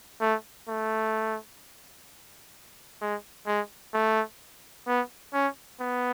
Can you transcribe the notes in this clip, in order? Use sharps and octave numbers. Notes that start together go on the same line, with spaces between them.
A3
A3
G#3
G#3
A3
B3
C#4
B3